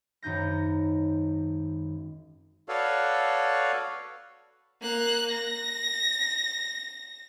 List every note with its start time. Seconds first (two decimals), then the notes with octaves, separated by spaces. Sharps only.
0.22 G#1 F#2 D#4 G6 A#6
2.69 F#4 A4 B4 C#5 D5 F5
4.81 A#3 F#6
5.31 A#6